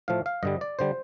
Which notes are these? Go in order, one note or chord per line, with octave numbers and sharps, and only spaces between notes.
A2 F3 A3 F5
F5
G2 D3 G3 D#5
D5
D3 G3 C5